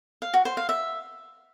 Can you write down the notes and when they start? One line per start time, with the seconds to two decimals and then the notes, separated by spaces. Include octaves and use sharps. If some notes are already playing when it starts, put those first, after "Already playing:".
0.22 F5
0.34 F#4
0.45 C5
0.57 F5
0.69 E5